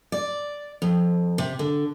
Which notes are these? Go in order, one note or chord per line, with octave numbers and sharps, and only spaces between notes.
D5
F2
C3
D3